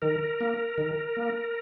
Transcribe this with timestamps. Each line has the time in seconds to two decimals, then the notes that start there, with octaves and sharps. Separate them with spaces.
0.02 D#3 A#4
0.41 A#3
0.78 D#3
1.17 A#3